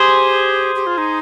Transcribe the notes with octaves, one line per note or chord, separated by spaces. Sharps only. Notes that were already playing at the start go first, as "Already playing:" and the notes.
Already playing: G4 G#4 C5
G4
F4
D#4